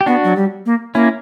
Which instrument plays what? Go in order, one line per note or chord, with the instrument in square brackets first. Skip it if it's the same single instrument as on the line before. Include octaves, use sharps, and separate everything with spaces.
[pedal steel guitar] G4
[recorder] B3 [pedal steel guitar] D4 F#4
[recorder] F#3
G3
A#3
[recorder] A#3 [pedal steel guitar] C#4 E4